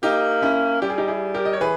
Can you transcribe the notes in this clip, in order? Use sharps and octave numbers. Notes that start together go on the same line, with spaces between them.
A#3 D#4 G4
C#4 E4
G3 G4
G#4
D#4 G4
E4 G#4
G4 A#4
D#5
C#5
E3 G#4 B4